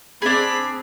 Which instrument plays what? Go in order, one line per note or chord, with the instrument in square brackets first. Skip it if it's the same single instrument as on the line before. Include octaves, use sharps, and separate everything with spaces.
[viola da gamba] C4 [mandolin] D4 G#4 [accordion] B5